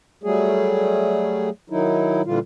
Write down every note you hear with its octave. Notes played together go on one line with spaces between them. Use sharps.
F#3 G3 A3 G#4
D#3 F#3 D#4 E4
A#2 D3 E3 G3 F4